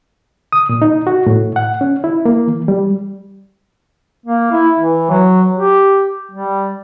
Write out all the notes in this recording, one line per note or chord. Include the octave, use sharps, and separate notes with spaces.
D#6
A#2
D#4
F#4
A2
F#5
C#4
E4
A#3
E3
G3
A#3
E4
E3
F#3
G4
G3